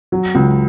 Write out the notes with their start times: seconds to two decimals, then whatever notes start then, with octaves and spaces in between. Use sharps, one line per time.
0.12 F#3
0.35 C#2